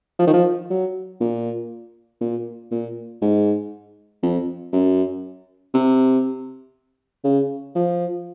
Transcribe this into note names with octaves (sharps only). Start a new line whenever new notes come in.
F3
D#3
F3
F#3
A#2
A#2
A#2
G#2
F2
F#2
C3
C#3
F3